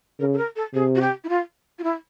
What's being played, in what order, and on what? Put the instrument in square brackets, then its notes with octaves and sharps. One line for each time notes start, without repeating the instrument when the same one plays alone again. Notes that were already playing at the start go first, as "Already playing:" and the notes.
[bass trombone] C#3 [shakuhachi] A#4
[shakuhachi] A4
A#4
A4
[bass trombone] C3 [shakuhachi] G#4
[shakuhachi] F#4
G4
E4
F4
F4
E4